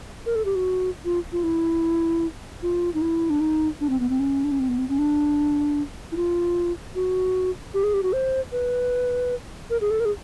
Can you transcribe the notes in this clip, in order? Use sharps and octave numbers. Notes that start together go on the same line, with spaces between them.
A#4
A4
G4
F#4
F4
F4
E4
F4
D#4
E4
D4
D#4
D4
C4
B3
C4
C#4
D4
C#4
C4
B3
C4
C#4
D4
E4
F4
F#4
G4
G#4
G4
F#4
C5
B4
A#4
G#4
A4
A#4
G#4